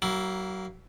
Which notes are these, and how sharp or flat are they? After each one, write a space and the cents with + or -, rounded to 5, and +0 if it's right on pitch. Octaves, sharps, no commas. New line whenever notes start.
F#3 +30 A#3 +0 E4 +0